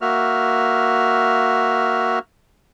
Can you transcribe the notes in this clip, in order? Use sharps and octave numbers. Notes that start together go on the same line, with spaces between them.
A#3 F#4 E5 F6